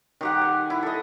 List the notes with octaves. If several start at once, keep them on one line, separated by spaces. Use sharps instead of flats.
D#3 G4 F#5
G#5
E4
A4 D#5